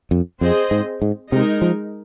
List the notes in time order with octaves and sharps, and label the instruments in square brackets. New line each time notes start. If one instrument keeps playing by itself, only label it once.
[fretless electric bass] F2
[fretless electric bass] F2 [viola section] C4 G#4 C5 D#5
[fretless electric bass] G#2
G#2
[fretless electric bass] C3 [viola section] G#3 D#4 A#4
[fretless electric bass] F3